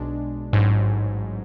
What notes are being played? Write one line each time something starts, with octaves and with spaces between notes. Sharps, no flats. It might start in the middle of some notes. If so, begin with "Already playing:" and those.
Already playing: B1 B2 G#3 D4
A1 G#2 F#3